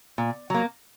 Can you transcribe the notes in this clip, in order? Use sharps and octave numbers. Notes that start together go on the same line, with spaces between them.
A#2
F#3 A#3